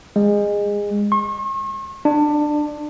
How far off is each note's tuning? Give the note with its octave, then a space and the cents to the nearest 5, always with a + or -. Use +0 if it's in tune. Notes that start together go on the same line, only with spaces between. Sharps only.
G#3 -20
C#6 -45
D4 +20